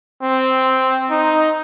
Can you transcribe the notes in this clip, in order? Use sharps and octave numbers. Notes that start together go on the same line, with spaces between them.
C4
D#4